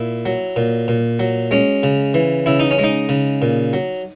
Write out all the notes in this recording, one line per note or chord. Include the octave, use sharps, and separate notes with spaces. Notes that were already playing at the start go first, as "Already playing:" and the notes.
Already playing: A#2 E4
F#3
A#2
A#2
F#3
G#3 C#4
C#3
E3
C#3 E4
D#4
C#4
G#3 D#4
C#3
A#2
F#3